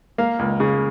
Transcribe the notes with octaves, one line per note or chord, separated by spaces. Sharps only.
A#3 F5
C#2
C#3